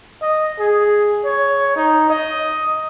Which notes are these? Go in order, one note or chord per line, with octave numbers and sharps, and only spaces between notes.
D#5
G#4
C#5
D#4
D#5